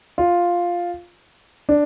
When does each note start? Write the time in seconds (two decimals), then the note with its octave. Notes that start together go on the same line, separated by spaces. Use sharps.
0.18 F4
1.69 D4